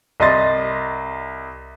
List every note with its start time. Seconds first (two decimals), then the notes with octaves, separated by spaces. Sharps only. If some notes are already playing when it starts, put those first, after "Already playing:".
0.20 C2 D#5 C6 A6